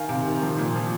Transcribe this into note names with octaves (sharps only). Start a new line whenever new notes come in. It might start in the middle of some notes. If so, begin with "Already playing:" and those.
Already playing: D#3 F5 G#5
C3
D#3
F3
A#2
F3